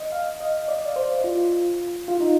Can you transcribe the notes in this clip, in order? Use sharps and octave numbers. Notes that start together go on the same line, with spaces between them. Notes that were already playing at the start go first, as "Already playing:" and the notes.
Already playing: D#5
F5
D#5
D5
C5
F4
F4
D#4